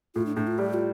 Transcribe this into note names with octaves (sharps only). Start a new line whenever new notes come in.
A2 F4
D4
A2 D4
F4
G3 G4
F4